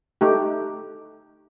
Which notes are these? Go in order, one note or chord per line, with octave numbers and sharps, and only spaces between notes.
A3 D#4 G4